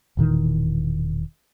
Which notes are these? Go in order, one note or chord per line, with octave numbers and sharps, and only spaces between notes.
E1 A#2 D#3 E3